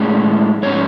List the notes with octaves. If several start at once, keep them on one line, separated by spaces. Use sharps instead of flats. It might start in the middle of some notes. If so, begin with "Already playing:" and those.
Already playing: A2 G#3 C#4 D5
G#2 G#3 C#4 C#5